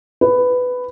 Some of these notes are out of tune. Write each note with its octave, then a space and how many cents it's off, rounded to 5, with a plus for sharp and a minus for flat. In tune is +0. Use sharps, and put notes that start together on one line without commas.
B4 +10